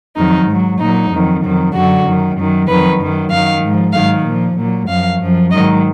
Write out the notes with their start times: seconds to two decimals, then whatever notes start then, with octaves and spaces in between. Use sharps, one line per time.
0.16 F2 D#3 F#3 D#4
0.48 G#2 F#3
0.79 A#2 F#3 D#4
1.10 F2 D#3 F#3
1.42 F2 D#3 F#3
1.74 F#2 D3 F#3 F#4
2.05 F#2 D#3 F#3
2.36 F#2 D#3 F#3
2.68 F2 D#3 F#3 B4
2.99 F#2 D#3 F#3
3.30 F#2 D#3 F#3 F5
3.62 G#2
3.67 F3
3.93 G#2 D#3 F#3 F5
4.25 A#2 F3
4.57 A#2 F#3
4.88 F#2 F3 F5
5.20 F#2 F3
5.51 G#2 D#3 F#3 D#5